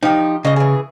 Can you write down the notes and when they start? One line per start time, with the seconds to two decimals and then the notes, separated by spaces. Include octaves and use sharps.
0.03 F3 D#4 G4
0.45 C#3 D#4 D#5
0.56 E3 G#4